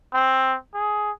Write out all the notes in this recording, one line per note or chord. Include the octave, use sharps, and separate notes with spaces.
C4
G#4